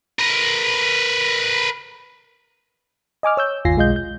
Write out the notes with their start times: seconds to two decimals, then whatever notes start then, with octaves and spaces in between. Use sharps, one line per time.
0.19 A#4 B4
3.23 D#5 G#5 D6 F6
3.37 C#5 E6 G6
3.65 G1 D#2 F4 G#5 A#6 C7
3.76 B1 G#3 F4 D#5 G6
3.96 G6